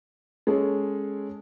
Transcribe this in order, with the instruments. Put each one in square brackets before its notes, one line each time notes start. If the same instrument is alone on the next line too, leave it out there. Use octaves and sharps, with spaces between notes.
[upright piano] G#3 C#4 G#4 A4